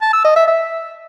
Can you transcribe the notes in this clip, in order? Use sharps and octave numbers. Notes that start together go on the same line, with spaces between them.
A5
E6
D#5
E5
E5